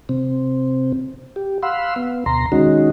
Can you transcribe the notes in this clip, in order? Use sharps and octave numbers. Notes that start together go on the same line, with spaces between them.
C3 C4
G4
F5 F#5 B5 C6 E6
B3
D2 B2 A#5 C6
D#3 G#3 C#4 D#4 F#4